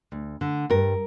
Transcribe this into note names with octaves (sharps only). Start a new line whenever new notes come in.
D2
D3
G2 A#4